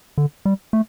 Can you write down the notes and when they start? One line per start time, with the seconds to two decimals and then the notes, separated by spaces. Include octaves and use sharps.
0.18 D3
0.45 G3
0.73 A3